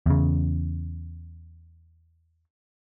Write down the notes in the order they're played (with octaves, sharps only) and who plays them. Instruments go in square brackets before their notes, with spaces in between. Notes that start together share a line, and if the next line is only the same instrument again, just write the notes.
[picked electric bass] E2 C#3